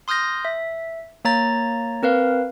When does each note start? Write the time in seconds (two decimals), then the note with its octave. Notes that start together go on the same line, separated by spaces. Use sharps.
0.08 C6 D#6 F6 G6 A#6
0.45 E5
1.25 A#3 C#5 A#5 A6
2.03 C4 A#4 B4 F5